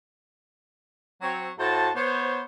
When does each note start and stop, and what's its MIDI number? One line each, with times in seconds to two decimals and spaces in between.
1.22 1.50 54
1.22 1.50 60
1.22 1.50 73
1.59 1.90 45
1.59 1.90 66
1.59 1.90 72
1.59 1.90 81
1.96 2.44 59
1.96 2.44 72
1.96 2.44 73